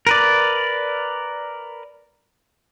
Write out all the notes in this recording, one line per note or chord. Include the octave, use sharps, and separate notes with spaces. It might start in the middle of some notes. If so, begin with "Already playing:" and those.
A#4 B4 D5